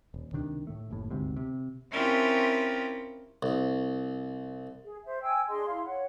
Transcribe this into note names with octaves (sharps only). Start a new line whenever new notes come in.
D#1
C#2 C3 D#3 D4
A2 A3
F#1 D#2 A2
G1 D2 G#2 C3
C3
C4 C#4 E4 F4 G4 A#4
C2
G#4
C5 E5
G5 G#5 E6
D4 G#4 D#5 C6
E4 F5 C6
C#5 F#5